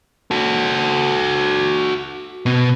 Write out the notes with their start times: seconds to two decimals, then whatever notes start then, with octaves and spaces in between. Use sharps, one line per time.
0.31 F#4 A4
2.46 B2